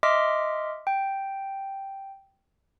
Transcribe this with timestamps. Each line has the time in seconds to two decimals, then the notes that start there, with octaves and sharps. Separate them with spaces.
0.03 D#5 E5 C6 D6 F6 B6
0.87 G5